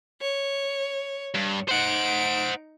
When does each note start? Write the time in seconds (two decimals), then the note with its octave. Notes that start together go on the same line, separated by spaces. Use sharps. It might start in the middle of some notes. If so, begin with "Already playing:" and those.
0.21 C#5
1.35 G2
1.69 D#4 C5 F#5 D7